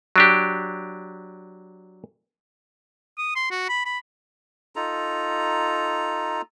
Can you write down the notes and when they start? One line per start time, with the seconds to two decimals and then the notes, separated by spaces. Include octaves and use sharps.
0.16 F#3 D4 G4
3.18 D#6
3.36 C6
3.51 F#4
3.69 B5
3.86 B5
4.76 D#4 F4 A4 A#5